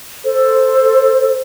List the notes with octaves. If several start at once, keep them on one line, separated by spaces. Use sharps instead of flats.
A4 C5